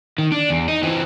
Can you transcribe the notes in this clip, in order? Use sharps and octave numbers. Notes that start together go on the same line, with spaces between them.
D#3
D4
E2
D#4
E3 C4